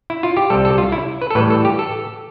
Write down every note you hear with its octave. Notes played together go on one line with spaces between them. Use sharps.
E4
F4
G4
C2 C3 G3 A4
A4
F4
E4
B4
A4
A2 E3 G3 B4
A4
G4
A4